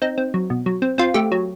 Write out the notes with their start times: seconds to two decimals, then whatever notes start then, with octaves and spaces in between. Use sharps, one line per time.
0.02 C4 D#4
0.18 C4
0.34 F#3
0.50 B2
0.66 F#3
0.82 C4
0.98 C4 F4
1.14 A3 G4
1.32 F#3